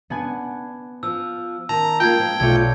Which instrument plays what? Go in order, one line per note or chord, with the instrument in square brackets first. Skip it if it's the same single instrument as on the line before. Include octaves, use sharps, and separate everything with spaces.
[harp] B3 F#5 G#5 [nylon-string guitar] D4
[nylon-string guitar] F3 [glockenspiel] E6
[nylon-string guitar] D#3 [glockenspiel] A5 [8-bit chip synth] A#5
[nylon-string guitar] G#3 A#3 F4 [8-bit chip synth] G5 [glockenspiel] G6 G#6
[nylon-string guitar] F3
[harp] B1 D5 C#7 [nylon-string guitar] A3 F4 [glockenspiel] G#6